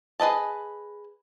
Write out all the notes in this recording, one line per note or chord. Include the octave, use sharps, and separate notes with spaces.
G#4 B4 D#5 A5